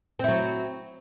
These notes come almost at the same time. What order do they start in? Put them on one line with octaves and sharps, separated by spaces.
C4 E4 F#3